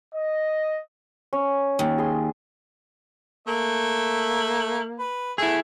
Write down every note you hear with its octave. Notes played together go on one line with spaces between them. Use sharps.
D#5
C#4
D#2
G#4 C6
A3 A#3 E5
B4
A3 E4 G#4 E5